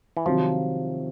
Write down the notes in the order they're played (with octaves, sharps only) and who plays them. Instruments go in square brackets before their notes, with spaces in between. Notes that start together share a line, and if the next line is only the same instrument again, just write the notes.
[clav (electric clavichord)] E3
[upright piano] C3 D#3 F#3 [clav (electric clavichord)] F3